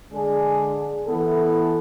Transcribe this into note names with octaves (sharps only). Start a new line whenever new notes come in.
D3 G#3 D4 G#4
E3 B3 E4 A4